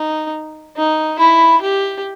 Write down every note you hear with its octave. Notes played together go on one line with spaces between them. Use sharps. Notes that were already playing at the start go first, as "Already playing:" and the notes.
Already playing: D#4
D#4
E4 B5
G4